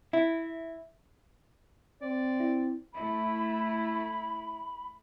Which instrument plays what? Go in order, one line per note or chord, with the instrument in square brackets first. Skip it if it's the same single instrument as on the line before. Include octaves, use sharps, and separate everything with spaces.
[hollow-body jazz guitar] E4 [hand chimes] E5
[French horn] C4 [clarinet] D5
[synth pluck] E4
[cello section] A3 E4 [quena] B5